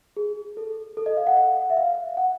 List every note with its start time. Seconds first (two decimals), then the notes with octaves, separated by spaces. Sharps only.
0.17 G#4
0.57 A4
0.97 A4
1.06 D#5
1.17 F5
1.27 F#5
1.37 F#5
1.70 E5
1.77 F5
2.17 F#5